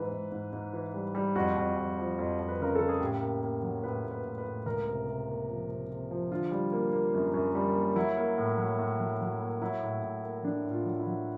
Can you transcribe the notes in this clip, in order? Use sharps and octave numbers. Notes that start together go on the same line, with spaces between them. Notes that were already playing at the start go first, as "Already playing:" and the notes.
Already playing: G#2 E3 B4
G#2
G#2
G#2
E3
G3
G3
F2 F#4
F2
F2
F3
F2
F2
B4
C#3 A#4
C#3 A4
G#4
A2 G4
A#3
A#3
F#3
A2 B4
A2
B4
A2
B4
A2
C#2 A#4
C3
C3
A#3
F3
C3
C3
F3
D3 F4
G3
A#3
A#3
F#2
F#2
G3
A#3
F#3 E4
A#3
A2
F#3
A2
F#3
F#3
A#3
F#3 E4
A2
A2
A#3
F#3 D4
A2
F4
F#3
E4
F#3